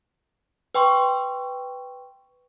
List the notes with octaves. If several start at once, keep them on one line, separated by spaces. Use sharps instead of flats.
B4 G5 C6 C#6